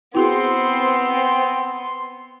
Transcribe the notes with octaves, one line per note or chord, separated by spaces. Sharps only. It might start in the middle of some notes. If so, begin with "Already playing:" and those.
B3 C4 E4 F#4 G#4 C6